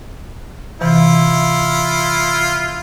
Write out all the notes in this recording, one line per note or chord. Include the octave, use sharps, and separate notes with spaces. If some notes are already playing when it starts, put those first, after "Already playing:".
C3 E3 E4 F4